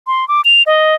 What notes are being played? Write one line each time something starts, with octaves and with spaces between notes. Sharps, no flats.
C6
D6
F7
D#5